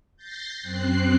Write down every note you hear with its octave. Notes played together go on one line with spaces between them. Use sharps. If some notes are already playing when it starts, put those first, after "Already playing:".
G6 A6 A#6 C7
F#2 C4 F#6 C7